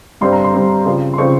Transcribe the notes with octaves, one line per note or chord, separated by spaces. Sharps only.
G2 G3 C4 C6
A#5
C6
G2 G3 C4
C#3 F3 C4
C6
C#3 F3 C4 C#6